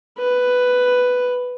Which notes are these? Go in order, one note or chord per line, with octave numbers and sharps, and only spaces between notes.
B4